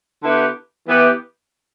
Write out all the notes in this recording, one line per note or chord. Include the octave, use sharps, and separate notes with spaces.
D3 B3 E4 G4
E3 B3 G4